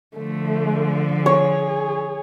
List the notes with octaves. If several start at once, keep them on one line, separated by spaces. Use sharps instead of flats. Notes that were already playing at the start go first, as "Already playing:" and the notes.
D3 F3 A3
G#4 C#5